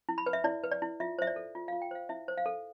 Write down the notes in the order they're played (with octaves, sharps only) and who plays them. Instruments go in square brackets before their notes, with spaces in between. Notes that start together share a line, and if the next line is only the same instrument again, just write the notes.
[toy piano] E4
B5
B4
E5
E4 D5
B4
D5
E4
F4 E5
C5 E5
D5
A4
F4
F4 F5
G5
C5 F5
E4 E5
C5
F5
A4